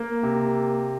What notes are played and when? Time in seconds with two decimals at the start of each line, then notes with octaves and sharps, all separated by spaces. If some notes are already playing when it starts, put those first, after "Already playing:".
Already playing: A#3
0.23 C3